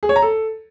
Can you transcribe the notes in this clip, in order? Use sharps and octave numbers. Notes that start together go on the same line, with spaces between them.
G#4
C#5
A#5
A4